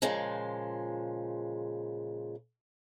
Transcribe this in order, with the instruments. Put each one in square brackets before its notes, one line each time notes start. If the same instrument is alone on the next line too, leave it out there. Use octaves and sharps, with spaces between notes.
[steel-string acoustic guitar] A#2 C#3 F3 G#3